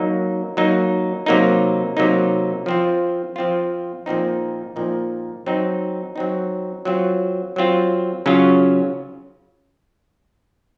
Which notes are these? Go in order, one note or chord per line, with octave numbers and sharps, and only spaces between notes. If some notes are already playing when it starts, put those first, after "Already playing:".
Already playing: F#3 A#3 D#4
F#3 A#3 D#4
C3 F#3 A#3 D#4
C3 F#3 A#3 D#4
F3 C4 F4
F3 C4 F4
A#2 F3 C4 D#4
A#2 F3 C4 D#4
F#3 C4 D#4
F#3 C4 D#4
F#3 C4 F4
F#3 C4 F4
C#3 F#3 C#4 F4